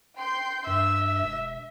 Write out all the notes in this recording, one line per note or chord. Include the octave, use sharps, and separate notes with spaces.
G5 C6 G6
G2 E5 E6
E1